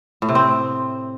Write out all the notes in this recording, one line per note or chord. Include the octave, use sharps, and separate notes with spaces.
A2
C3
C4